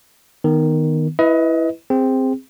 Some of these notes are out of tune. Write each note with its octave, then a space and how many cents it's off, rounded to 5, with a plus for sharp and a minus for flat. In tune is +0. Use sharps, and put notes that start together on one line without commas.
D#3 +0 B3 +0
E4 +0 B4 +0 D#5 +30
C4 +0 G#4 -20